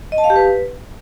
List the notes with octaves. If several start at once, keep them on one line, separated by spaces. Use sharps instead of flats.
D#5
A5
F5
G4
B4